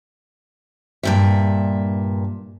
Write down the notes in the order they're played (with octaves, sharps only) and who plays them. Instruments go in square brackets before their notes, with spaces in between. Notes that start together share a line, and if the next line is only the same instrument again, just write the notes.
[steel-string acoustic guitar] G2 A#2 E5